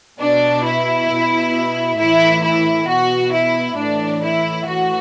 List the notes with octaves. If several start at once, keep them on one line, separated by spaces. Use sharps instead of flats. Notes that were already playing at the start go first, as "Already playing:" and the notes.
B2 D4
E4
B2
A2 E3 E4
E4
B2 F#4
E4
A2 E3 D4
E4
A2 E3 F#4